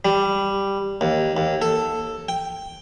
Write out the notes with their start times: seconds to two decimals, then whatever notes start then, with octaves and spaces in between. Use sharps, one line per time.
0.05 G3
1.01 D#2
1.37 D#2
1.62 A4
2.29 G5